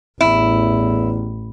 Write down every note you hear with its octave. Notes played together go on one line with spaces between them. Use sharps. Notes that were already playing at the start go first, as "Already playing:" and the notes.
A1 E2 E4